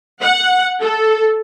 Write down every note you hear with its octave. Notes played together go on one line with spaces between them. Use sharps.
F#5
A4